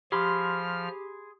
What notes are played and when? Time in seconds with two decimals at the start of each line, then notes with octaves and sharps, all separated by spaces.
0.12 F3 G4 G#4 B5 C6 F6